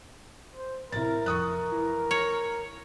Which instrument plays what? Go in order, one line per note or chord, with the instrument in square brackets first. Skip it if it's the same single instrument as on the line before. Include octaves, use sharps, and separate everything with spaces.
[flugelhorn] C5
[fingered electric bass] A1 C3 [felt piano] E4 A6 [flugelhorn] A#4
[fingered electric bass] F2 [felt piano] C#6 D#6 F#6
[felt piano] E3
[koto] C#5